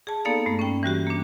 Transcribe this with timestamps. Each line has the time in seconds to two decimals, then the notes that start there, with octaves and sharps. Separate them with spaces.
0.07 G#4 A5
0.25 A#3 B3 D#4 A4 D5 F5
0.46 G2 A3
0.59 C#4 G5
0.83 E3 G3 F#4 G4
1.07 A#3 D4